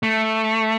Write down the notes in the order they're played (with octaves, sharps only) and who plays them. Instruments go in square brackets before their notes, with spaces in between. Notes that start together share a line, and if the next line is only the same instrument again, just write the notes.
[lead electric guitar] A3